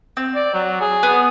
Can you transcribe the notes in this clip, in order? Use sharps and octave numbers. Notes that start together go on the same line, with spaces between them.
C4
D5
F#3
G#4
B3